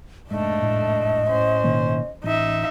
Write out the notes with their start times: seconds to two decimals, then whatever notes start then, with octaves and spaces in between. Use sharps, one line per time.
0.31 F1 G#2 A3 D4 D#5
0.62 A2
1.29 C#4 C5
1.64 B2 D#3 A#3
2.24 A1 D#4 E5